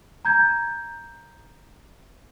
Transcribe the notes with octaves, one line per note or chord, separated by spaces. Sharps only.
A#5 G6 G#6